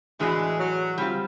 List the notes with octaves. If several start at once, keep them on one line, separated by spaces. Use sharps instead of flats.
A2 E3 G#3 A3 D4 F#4
F#3
G3 C4 F4